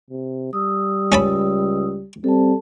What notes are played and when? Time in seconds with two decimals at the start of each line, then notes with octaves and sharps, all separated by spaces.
0.10 C3
0.53 G3 D#6 E6
1.12 C#2 C#4 A5 B5
2.24 G3 C4 A4 A5